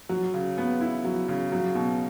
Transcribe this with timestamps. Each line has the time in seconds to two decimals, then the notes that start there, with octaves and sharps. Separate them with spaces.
0.09 F#3
0.34 C#3
0.58 B3
0.81 E4
1.05 F#3
1.28 C#3
1.52 F#3
1.75 B2